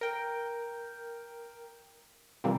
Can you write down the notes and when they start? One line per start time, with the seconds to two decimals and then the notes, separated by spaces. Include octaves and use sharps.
0.01 A#4 G5
2.44 C3 E3 F3 G3 A#3 C4